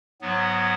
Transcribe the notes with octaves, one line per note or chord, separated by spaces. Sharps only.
G#2 F#3 B3